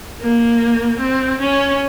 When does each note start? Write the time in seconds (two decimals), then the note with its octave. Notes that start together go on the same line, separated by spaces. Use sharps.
0.22 A#3
0.99 C4
1.40 C#4